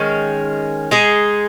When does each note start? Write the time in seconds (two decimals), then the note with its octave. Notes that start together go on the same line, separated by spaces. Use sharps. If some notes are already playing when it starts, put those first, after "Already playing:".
Already playing: D#3 G#3 C#4
0.91 G#3 D#4 G#4